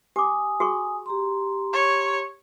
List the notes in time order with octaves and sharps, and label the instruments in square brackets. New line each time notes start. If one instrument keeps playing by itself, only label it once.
[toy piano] G4 D6 [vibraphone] G#5 D#6
[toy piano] F#4 G#4 C#6
[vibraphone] G4 A#5 C6
[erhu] C#5